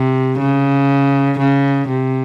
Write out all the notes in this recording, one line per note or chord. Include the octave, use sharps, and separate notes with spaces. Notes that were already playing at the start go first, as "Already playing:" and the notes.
Already playing: C3
C#3
C#3
C3